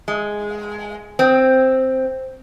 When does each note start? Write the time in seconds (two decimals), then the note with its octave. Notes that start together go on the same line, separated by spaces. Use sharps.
0.08 G#3
1.19 C4